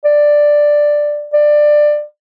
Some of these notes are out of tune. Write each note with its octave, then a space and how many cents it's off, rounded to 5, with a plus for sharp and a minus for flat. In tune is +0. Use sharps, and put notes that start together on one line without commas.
D5 +5
D5 +15